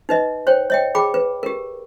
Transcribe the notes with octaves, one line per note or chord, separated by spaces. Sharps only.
D#4 B4 D#5
C5 C#5 G5
C#5 D#5 G5
G#4 G5 B5 D6
B4
G4 A#4